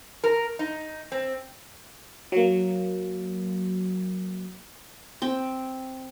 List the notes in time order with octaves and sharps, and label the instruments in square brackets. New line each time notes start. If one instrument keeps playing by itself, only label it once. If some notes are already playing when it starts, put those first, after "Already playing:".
[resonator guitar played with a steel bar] A#4
D#4
C4
[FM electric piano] F#3 A#3
[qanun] C4 G5